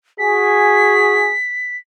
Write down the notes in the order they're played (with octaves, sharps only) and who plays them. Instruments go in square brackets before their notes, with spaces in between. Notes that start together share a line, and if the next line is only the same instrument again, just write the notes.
[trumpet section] F#4 G#4 [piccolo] B6